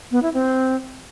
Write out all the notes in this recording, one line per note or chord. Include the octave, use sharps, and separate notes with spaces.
B3
E4
C4